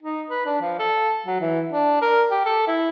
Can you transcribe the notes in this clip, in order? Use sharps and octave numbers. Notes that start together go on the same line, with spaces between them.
D#4
B4
D4
F3
A4
F#3
E3
D4
A#4
G4
A4
E4